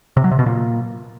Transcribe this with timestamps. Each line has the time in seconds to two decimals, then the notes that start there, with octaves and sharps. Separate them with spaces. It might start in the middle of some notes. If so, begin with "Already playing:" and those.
0.17 C3
0.24 F#3
0.31 C3
0.39 B2
0.46 A#2